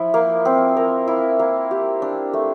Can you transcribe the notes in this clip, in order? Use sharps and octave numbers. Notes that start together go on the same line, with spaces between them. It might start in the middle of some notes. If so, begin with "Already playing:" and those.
Already playing: F3 E4
A#3
C4
A#4
E4
A#3
G4
D4
A3